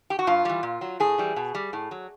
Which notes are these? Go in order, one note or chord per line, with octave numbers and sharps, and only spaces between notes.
G4
F#4
G2 F4
E3 G3
A#2
F#3
A2 G#4
E3 G3
B2
G3
A2
F#3